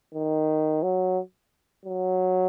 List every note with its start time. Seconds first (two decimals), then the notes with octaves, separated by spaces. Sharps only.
0.14 D#3
0.83 F#3
1.86 F#3